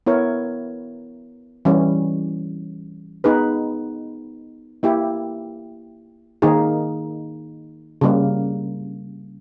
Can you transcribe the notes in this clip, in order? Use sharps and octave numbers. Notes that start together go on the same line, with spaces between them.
B3 E4 A#4 C#5
E3 G3 C#4
B3 D#4 G#4 B4
A#3 E4 G4
D#3 A#3 D#4 G#4
C#3 G3 A#3